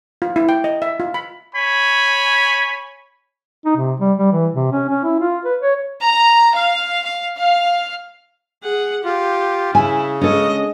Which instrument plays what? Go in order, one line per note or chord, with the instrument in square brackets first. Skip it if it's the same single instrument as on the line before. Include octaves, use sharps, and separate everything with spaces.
[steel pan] F4
E4
G5
D#5
E5
F4
B5
[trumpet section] C#5 G#5 B5
[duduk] D#4
C3
G3
G3
E3
C3
C#4
C#4
E4
F4
B4
C#5
[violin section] A#5
F5
F5
F5
[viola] G#4 F#5
[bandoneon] F4 [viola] G4
[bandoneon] C#3 [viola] E4 [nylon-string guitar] G#5
[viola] G#3 D#5 [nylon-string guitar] C#4 A4